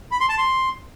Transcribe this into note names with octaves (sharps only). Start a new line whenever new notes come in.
B5
C6
A5
C6